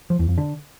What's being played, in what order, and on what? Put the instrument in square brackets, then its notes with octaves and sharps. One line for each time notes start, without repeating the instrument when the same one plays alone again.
[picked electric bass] F3
E2
F2
D3